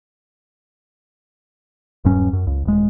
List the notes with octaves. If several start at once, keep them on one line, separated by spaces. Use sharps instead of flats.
D#1 G2 F#3 C#4
F#2
C#2
D#1 G#3